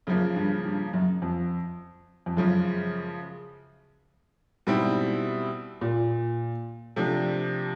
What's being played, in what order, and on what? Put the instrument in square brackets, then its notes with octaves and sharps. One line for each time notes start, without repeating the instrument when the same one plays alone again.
[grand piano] F#2 [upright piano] C#3 F3 A#3
[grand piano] G2
G2
F#2
F2
F2
[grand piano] F#2 [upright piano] C#3 F3 G#3
[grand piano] G#2 [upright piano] B2 G3 C4 E4
[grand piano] A#2
[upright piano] C3 F3 A3 D4